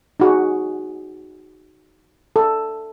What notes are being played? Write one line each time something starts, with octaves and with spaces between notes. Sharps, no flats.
D#4 F#4 G#4
A4